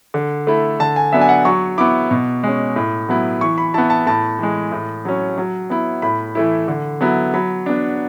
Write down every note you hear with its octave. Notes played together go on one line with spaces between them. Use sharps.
D3
A3 E4
D3 A5
G#5
F#3 B3 D4 E5
G#5
F#5
F#3 C#6
B3 E4 D6
B2
G#3 C#4
A2
F#3 B3 E4
E3 C#6
B5
B3 E4 A5
A5
A2 A5
E3 G#3
A2
F#3 C#4
F#3
B3 E4
A2 B5
E3 A3 E4
D3
F#3 B3 E4
F#3 B5
B3 D4